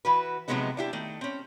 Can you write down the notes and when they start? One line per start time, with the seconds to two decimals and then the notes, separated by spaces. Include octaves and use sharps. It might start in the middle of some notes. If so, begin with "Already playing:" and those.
0.05 E3 F#4 B4
0.48 C3 F3 F#3 G#3 B3 D#4
0.77 D4 E4 G4
0.93 D#3 A3
1.21 C4 C#4